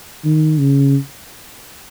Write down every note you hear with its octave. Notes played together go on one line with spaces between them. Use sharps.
D#3
C#3